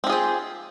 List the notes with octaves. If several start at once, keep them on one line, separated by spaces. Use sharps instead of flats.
C4 F4 G4 G#4